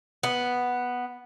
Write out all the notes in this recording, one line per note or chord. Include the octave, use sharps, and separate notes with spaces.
B3